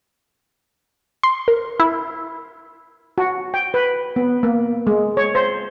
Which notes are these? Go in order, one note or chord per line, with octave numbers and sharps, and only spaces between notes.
C6
A#4
E4
F#4
G5
B4
B3
A#3
G#3
C#5
C5